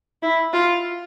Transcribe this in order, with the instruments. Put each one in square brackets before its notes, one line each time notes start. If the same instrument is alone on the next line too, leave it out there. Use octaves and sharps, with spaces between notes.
[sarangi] E4
F4